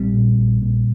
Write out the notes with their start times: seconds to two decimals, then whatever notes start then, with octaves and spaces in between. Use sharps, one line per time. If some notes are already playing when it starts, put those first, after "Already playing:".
Already playing: A#1 G3 C4
0.14 A#2
0.38 A#1
0.61 A#2